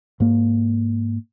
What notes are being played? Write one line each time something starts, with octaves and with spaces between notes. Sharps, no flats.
G#2 A#3